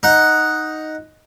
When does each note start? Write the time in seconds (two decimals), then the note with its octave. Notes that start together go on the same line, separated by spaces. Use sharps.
0.03 D#4 F#5